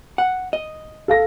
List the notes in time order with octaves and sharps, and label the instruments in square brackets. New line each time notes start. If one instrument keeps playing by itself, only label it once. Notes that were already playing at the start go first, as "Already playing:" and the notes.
[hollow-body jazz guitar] F#5
D#5
[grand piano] A4 F5 A#6